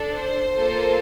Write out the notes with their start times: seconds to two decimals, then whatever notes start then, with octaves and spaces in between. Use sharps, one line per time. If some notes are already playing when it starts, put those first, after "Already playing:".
Already playing: D4 A4
0.11 C5
0.55 A#3 F4 A4